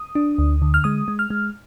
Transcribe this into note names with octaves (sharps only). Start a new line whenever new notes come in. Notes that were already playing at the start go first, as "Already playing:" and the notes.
Already playing: D#6
D4
D2
D3
F6
G#3 D#6
G#3
F6
G#3